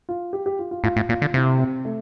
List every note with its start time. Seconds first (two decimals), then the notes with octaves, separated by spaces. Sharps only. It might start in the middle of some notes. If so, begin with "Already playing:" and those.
0.09 F4
0.33 G4
0.46 G4
0.59 F4
0.71 F4
0.84 A2 F4
0.96 A2
1.09 A#2 F4
1.22 D3
1.34 C3 E4
1.59 C4
1.85 A3